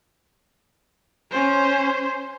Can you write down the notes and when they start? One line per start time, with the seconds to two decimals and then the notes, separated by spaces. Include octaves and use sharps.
1.31 C#4 C5